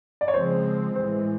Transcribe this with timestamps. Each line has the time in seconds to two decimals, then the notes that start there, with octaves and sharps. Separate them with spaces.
0.21 D5
0.28 C#5
0.34 C#3 F3 G#3 C4 C5
0.96 A2 E3 G#3 C5